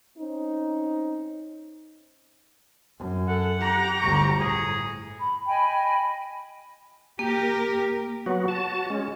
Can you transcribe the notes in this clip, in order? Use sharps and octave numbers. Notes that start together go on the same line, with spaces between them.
C4 C#4 D#4
F#2
A4 F#5
G4 A#5
G1 D2 C#6
A2 G#4
B5
D#5 G5 G#5 B5
A#3 G4 A#4
F#3 B3 F#4
F#4 A5
G#3 C#4